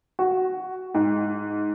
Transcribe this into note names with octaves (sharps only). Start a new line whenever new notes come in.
F#4
G#2